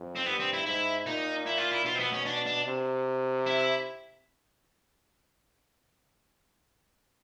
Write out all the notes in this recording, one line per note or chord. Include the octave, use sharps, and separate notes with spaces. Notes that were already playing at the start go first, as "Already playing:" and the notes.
Already playing: F2
C4
G2 B3
C4
E4
G#2 E4
A#2 D#4
E4
F4
E4
B2 F4
C4
B3
C#4
D4
D4
C3
E4